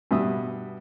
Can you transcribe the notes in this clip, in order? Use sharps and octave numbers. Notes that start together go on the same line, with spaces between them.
G2 B2 E5 D#6